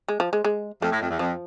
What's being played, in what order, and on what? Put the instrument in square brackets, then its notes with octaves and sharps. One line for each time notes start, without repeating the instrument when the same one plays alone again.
[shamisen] G#3
F3
G#3
G#3
[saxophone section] F2 [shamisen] A3
[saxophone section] A2
F2
E2
[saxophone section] F2 [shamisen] F3